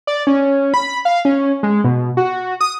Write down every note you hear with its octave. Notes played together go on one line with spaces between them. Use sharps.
D5
C#4
B5
F5
C#4
G#3
B2
F#4
D#6